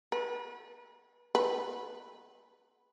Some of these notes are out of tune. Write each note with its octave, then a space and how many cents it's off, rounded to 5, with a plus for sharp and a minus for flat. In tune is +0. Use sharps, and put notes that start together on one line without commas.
B4 -35
B4 -5